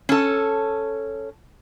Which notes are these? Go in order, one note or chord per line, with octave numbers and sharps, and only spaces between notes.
C#4 A4